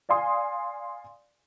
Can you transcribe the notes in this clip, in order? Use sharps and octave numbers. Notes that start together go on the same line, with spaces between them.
D5 F5 G#5 C6 D#6